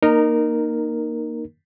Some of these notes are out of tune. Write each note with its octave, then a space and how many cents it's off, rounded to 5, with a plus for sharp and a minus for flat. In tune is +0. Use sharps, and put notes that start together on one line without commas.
A#3 +5 D#4 -20 A#4 +0